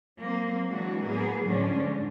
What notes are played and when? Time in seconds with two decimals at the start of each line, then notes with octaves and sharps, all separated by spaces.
0.21 F#3 A#3 C4
0.68 E3 F#3 G#3 D4 F#4
1.06 A2 F#3 A#3 B3 G#4
1.44 A2 D3 F3 G#3 C#4 D4
1.74 G#2 D3